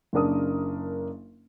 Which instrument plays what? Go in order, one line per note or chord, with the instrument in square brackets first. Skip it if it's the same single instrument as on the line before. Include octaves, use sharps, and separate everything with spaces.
[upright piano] F#1 C#3 D4 A#4 D#6